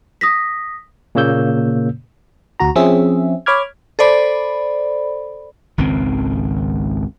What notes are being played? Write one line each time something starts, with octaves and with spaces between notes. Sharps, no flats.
D#6 A#6 B6
A#2 C#3 A#3 C#5 E6 G6
D2 F#4 A#5
F3 C4 C#4 G#4 E5
C#5 B5 D6 F6 G#6
A4 C5 D5 B5
G#1 C#2 D#3 C4